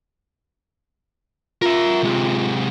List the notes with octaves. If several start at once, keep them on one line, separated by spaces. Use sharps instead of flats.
F4 A#4 E5
C3 G#3